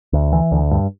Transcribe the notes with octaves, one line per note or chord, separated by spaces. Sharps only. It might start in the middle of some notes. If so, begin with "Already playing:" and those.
D2
E3
D2
G2